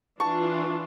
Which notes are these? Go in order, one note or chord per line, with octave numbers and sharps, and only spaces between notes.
E3 D4 F4 A5 C#6